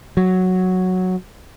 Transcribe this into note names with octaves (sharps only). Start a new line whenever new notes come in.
F#3